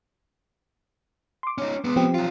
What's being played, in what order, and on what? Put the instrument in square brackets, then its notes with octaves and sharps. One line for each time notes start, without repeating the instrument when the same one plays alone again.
[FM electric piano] C6 D6
[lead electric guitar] C#4 D#4
G#3 B3
[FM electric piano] F3 C4 G4
[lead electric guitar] F#3 F4